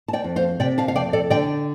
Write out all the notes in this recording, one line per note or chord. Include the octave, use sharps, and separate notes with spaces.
A5
D5 G5
F2
C5 F5
C3 D5 G5
F5 A5
F5
F2 D5 G5
A4 D5
D3 D5 G5